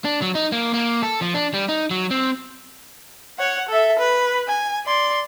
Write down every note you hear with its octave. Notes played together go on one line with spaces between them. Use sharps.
D4
F#3
D#4
A#3
A#3
A4
F3
D4
G3
D#4
F#3
C4
C#5 F#5
A4 E5
B4
G#5
D5 C6